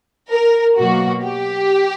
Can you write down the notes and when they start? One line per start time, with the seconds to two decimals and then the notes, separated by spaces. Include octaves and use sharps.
0.30 A#4
0.77 B2 F#3 A#3 F#4
1.23 G4